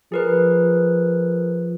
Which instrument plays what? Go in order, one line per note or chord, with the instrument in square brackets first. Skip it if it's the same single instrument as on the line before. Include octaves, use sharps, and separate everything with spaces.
[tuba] F3 [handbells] G#4 A#4 B4